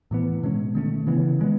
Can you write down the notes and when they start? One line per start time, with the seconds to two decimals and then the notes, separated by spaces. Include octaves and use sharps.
0.11 A2 E3 B3
0.43 B2 G#3 C#4
0.75 D#3 A3 C#4
1.07 C#3 E3 B3
1.39 D#3 G#3 B3